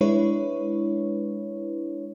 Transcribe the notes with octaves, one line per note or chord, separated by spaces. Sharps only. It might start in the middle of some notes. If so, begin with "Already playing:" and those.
G#3 D4 E4 B4 C#5